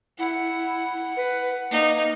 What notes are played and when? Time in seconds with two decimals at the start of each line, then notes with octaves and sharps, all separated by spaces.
0.19 E4 F#5
1.17 B4
1.71 A#3 D#4